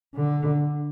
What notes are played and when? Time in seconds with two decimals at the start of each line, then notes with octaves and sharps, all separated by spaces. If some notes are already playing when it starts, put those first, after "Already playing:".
0.15 D3